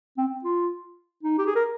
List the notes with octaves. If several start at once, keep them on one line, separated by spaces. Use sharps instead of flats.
C4
F4
D#4
G4
G#4
A#4